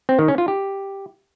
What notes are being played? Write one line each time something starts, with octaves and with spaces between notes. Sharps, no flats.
C4
D#3
C#4
F4
G4